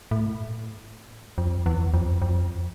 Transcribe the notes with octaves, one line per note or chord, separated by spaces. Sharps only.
A2
F2
E2
F2
F2